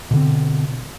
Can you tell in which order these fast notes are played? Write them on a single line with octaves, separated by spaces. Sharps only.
B2 D3 C4